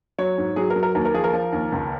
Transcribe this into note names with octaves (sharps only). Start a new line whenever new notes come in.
F#3 C#5
G#2
F#3 G#4
A#4
F#3
A#4
D#2 A#4
A#4
F3 G#4
A#4
F3
D#2
C#2